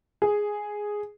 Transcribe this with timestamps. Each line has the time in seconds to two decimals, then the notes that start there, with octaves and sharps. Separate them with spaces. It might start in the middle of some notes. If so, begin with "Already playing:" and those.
0.22 G#4